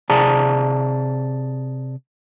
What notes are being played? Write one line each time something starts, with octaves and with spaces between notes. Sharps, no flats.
C3 G#4 D5 A5 A#5